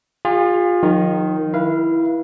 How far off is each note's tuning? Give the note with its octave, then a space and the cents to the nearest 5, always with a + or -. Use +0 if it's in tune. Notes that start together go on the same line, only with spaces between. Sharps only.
F4 +20 G#4 -40
D#3 +0 F#3 -45
E4 +0 B4 -35 F5 -20